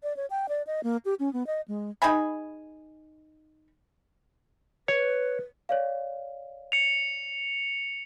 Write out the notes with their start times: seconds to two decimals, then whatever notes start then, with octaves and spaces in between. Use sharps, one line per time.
0.03 D5
0.17 C#5
0.30 G5
0.49 D5
0.67 D#5
0.83 A#3
1.05 G4
1.19 C#4
1.33 B3
1.47 D#5
1.68 G#3
2.02 D#4 G#4 G#5 B5
4.88 B4 C#5
5.69 C#5 D5 F5
6.72 C#7 F7